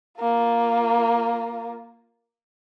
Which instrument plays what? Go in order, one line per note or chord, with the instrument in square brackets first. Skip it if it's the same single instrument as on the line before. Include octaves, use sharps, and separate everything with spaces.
[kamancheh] A#3 F4